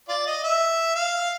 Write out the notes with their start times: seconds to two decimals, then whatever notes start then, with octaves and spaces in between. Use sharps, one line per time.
0.09 F4 D5
0.27 D#5
0.44 E5
0.95 F5